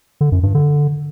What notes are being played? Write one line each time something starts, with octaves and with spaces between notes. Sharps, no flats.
D3
F#2
G2
D3